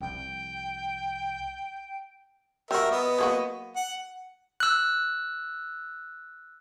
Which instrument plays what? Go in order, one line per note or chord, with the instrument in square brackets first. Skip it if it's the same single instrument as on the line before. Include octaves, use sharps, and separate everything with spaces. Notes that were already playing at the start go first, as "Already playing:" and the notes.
[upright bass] C2 F3 [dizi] G5
[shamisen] G3 F#4 [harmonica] A#4 E5
[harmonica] B3 D#5
[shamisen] F#3 A#3 F#4
[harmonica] F#5
[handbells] E6 F#6